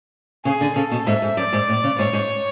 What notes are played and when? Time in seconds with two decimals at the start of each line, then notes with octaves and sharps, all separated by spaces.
0.45 C#3 G#4
0.61 D3
0.76 C#3 A4
0.92 B2
1.07 G#2 E5
1.22 G#2
1.37 F#2 D5
1.53 G#2
1.69 A2
1.84 C#3
1.99 G#2 C#5
2.13 G#2